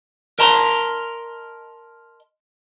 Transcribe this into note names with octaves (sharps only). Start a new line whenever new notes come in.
A#4 D#5 A5 A#5 C6